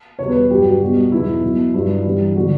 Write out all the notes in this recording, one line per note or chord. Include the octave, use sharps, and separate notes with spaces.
E2 B2 G3 C#5
B4
G2 F#3 G4
F#4
B2 G3 F#4
E2 B2 F#3 E4
B2 F#3
G2 F#3 E4
G2 E3 G3
D3 F#3 F#4